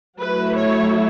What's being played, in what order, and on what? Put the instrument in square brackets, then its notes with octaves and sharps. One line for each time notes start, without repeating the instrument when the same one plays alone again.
[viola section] F#3 A3 E4 B4
C#5